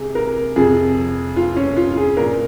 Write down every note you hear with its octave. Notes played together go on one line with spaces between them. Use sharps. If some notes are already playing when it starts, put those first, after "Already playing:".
Already playing: C3 G#4
A#4
F2 C3 F3 G#4
F4
C#4
F4
G#4
A#2 F3 A#4